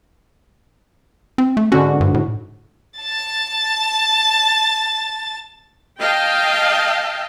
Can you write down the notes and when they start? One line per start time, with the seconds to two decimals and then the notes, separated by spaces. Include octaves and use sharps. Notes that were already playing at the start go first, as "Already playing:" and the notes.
1.38 C4
1.57 A3
1.72 G#2 D3 C#4 F#4
2.01 G2
2.14 A2
2.99 A5 A6
5.99 D#5 F5 G5 A5